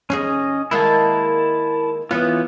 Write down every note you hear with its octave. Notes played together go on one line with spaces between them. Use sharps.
D#2 C#4 E4 G#4 D#5
D#3 G#3 A#3 E4 A5
E3 B3 C#4 E4 F4